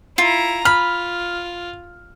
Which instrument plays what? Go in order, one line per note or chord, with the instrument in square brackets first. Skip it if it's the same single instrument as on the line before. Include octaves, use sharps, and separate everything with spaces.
[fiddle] E4 A#5 [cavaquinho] F4
[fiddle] F4 [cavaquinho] B5 [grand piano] F6